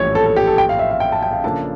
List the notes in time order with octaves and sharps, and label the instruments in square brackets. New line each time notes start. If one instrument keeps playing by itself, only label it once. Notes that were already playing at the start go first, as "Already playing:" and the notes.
Already playing: [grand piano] A#1 A2 E3 G3 C#4 [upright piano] C#5
[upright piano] A4
A4
G4
A4
G5
F5
E5
F5
G5
A5
G5
F5
[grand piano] C#3 F3 A#3 D4 A4 [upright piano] A5